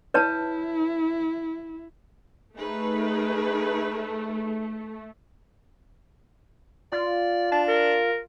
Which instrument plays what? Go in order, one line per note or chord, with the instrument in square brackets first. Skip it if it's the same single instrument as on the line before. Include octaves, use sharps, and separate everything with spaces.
[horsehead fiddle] E4 [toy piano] B4 C#5 A5
[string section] A3 [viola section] D#4 G#4 B4
[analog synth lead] F4 [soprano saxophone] D5
[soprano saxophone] D4 [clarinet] A5
[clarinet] A#4